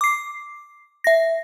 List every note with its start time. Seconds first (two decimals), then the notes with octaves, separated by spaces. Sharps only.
0.01 D6 C7
1.04 E5 A#6